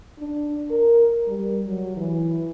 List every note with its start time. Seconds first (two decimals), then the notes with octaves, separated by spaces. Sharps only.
0.20 D4
0.71 A#4
1.28 G3
1.67 F#3
1.97 E3